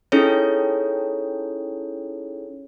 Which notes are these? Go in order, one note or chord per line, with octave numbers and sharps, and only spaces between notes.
C#4 D#4 E4 G#4 A4 C#5